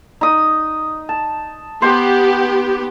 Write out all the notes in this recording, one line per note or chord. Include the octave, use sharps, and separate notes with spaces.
D#4 D#6
A5
B3 G4 C5